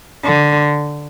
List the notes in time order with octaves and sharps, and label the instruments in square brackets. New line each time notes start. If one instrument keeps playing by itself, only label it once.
[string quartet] D3